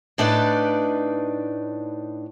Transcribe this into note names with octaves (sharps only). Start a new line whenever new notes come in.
A2 D4 D#4 B4 D5